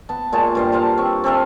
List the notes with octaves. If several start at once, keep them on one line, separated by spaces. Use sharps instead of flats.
B3 A5
A#2 G#3 C#5 A5
G2 C5 F5
C5 F5 A5 A#5
C4 C#6
C4 A4 E5 F5